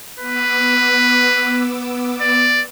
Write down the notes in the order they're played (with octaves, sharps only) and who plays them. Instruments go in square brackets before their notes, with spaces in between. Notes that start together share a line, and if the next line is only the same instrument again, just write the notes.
[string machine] B3 D6 E6 [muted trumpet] B4
[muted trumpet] D5